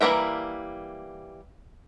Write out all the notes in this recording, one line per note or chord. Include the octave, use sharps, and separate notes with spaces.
E3 G3 A#3 A#4 E5